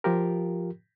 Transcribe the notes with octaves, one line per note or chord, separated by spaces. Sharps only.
F3 F4 G4 A#4